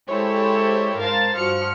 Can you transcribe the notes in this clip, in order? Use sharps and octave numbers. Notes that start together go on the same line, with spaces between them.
G#3 E4 G4 A4 C5 C#5
G#2 A#4 C5 F5 A5 A6
G2 F3 F#4 F6 C#7